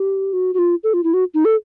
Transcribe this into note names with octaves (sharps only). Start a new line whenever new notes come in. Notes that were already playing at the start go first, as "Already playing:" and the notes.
Already playing: G4
F#4
F#4
F4
A4
F4
E4
F#4
D#4
A4